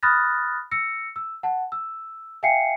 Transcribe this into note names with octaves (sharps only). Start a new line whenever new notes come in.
B5 D#6 F6 F#6 A6 A#6
E6 A#6 C#7
E6
F#5 A5
E6
E5 F5 G5 G#5 C7 C#7